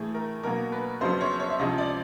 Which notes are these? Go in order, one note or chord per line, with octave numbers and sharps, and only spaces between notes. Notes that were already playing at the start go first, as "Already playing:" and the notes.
Already playing: A2 E3 A3 G#4
A#4
B2 F#3 A#3 A#4
B4
F2 C#3 F#3 B3 C5
C#5
C#5
E5
C#2 C3 F3 D#5
D5